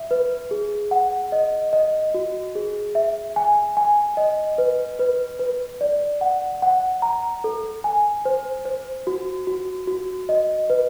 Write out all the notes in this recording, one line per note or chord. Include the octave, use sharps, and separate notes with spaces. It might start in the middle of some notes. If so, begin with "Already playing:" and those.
Already playing: E5
B4
G#4
F#5
D#5
D#5
F#4
G#4
E5
G#5
G#5
D#5
B4
B4
B4
D5
F#5
F#5
A#5
A4
G#5
C5
C5
F#4
F#4
F#4
D#5
B4